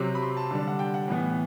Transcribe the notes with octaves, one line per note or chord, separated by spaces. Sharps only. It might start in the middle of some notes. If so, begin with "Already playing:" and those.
Already playing: C3 F#3 C4 D6
B5
C6
A5
D3 G3 D4
F#5
G5
F#5
A2 E3 B3